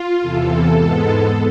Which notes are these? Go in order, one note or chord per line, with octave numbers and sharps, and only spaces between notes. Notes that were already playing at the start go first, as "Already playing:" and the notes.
Already playing: F4
E2 C3 E3 A4
G#2 G#3 B3